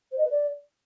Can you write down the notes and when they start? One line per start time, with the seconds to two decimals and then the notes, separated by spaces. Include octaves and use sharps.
0.11 C5
0.18 D#5
0.24 B4
0.31 D5